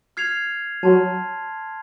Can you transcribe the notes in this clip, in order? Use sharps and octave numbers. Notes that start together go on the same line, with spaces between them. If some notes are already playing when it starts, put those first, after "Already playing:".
F6 G#6 C7 F7
F#3 A5 C6 F6